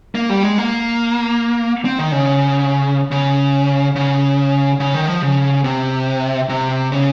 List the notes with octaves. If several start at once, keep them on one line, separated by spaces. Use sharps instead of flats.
A#3
G3
G#3
A#3
C4
D#3
C#3
C#3
C#3
C#3
D#3
F3
C#3
C3
C3
C#3